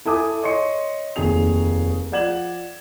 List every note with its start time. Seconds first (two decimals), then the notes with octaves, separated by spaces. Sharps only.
0.05 E4 A4 G#5 A5 D6 D#6
0.43 C#5 D#5 C6 C#7
1.16 F1 D#2 G#4 F7
2.12 F3 D5 F#5 G#6 E7 F#7